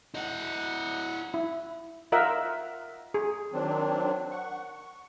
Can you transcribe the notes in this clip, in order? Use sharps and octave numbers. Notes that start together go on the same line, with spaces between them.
E4 D#5 F#5
E4
F4 A#4 D#5 E5 F#5
G#4
D#3 F#3 C4 D4
F#5 C#6
C#6